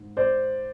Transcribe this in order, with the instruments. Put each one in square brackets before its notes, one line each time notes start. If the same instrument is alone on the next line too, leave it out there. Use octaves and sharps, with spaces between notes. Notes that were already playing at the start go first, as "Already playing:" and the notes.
Already playing: [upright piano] G#2 D#3
C5 D5